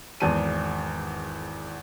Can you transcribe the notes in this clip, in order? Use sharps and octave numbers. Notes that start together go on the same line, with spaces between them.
G#1 E2 A5 D#7